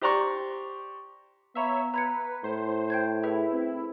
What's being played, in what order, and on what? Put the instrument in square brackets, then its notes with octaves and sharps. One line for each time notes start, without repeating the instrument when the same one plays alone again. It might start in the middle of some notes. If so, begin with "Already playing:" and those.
[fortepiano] G4 C5 D5 A#5 C6 C#6
[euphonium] B3 [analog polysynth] C#5 E5 [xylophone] F5 A#5 B5
[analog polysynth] B4 [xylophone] A#5 G#6 C#7
[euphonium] A2 [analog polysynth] C5
[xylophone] G5 G6 G#6
[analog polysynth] E4 [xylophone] G#4 B4 E5
[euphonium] C4